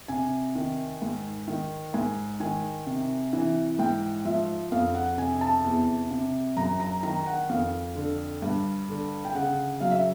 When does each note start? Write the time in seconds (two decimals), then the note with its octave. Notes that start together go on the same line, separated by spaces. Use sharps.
0.08 C3 G#5
0.55 D#3
1.02 G#2
1.48 D#3
1.94 G#2 G#5
2.40 D#3 G#5
2.86 C3
3.33 E3
3.79 G#2 G5
4.25 F3 E5
4.72 F2 F5
4.95 F#5
5.17 C3 G#5
5.41 A5
5.64 E2
6.10 C3
6.57 F#2 A#5
6.80 A#5
7.03 D#3 A#5
7.26 F#5
7.49 F2 F5
7.95 D3
8.42 G2
8.89 D3
9.25 G5
9.34 C#3 F#5
9.81 F#3 F5
9.91 E5